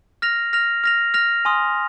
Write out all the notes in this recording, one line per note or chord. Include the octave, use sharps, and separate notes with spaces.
F6 A#6 F7
F6 A#6 F7
F6 A#6 F7
F6 A#6 F7
G#5 C6 D#6